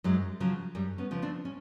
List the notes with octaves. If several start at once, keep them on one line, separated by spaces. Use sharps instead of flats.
F#2 F#3 G#3
C#3 F3 F#3
F#2 G3
B3 C#4
C#3 F3
C4 D4
C#4